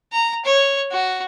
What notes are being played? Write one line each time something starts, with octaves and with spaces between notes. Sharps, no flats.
A#5
C#5
F#4